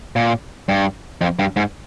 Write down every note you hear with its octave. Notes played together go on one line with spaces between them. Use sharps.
A#2
G2
F2
G2
G#2